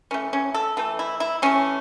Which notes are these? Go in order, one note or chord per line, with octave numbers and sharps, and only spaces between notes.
E3 A3 C#4
C#4
A4
E3 A3 A4
E4
E4
E3 A3 C#4